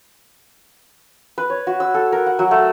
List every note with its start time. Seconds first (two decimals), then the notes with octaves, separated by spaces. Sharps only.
1.38 B4
1.50 C#5
1.67 F#4
1.80 E6
1.94 A4
2.12 A#4
2.26 F#5
2.39 F#3
2.51 A3